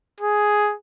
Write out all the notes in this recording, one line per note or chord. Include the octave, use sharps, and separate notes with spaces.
G#4